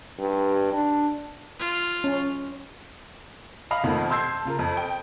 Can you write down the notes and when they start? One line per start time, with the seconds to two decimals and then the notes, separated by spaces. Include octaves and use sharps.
0.19 G2
0.73 D4
1.59 F4
2.04 C#4
3.71 D#5 F5 B5
3.84 F2 B2 D#3 F3 A3 A#3
4.10 A5 C6 E6 G6 G#6 C7
4.45 C#3 F4 A#4
4.59 F2
4.77 G5